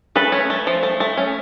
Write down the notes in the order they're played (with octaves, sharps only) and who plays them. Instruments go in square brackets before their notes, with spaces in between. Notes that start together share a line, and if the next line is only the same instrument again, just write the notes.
[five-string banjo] A3 A4 B4
C#4
A3
F3
A3
A3
C#4